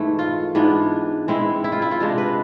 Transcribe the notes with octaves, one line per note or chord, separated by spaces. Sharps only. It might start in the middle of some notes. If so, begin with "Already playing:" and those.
Already playing: G#2 E3 A3
F4
G#2 E3 B3 D4
E3 G#3 C4 E4
E4
F4
E4
F4
C3 G#3 D4
B4